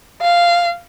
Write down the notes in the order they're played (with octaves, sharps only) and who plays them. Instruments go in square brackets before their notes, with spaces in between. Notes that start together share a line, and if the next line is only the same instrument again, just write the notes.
[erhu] F5